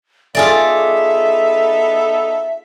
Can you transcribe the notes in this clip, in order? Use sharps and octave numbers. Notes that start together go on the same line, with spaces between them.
B3 D#4 F4 G#4 A4 D5 E5